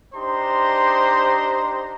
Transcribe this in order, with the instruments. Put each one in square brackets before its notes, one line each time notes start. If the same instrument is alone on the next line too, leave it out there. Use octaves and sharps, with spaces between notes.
[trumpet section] D4 D#4 G4 C5 A#5 C6